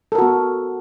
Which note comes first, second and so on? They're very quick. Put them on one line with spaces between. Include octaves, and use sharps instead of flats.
A4 A#4 F#4 B3